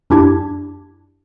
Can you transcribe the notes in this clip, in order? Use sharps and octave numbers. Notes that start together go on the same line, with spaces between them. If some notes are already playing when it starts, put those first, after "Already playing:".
F#2 D4 E4 G4 A5 G#6